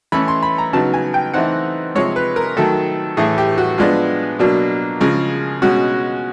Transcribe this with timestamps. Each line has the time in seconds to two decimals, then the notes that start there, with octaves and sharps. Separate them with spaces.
0.12 E3 A3 C#4 B5
0.28 C6
0.43 B5
0.58 A#5
0.73 C#3 F#3 B3 D#4 A5
0.94 G#5
1.14 G5
1.34 E3 A3 C4 D#4 F#5
1.95 C3 F3 G#3 C#5
2.16 B4
2.36 A#4
2.57 D#3 F#3 A3 A4
3.17 A2 E3 A3 G#4
3.38 G4
3.58 F#4
3.78 F3 G#3 B3 D4 F4
4.39 B2 F#3 A#3 D4
5.00 C#3 F3 G#3
5.62 B2 G#3 C#4 F#4